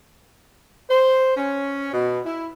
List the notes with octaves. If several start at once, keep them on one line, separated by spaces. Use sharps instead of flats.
C5
C#4
B2
E4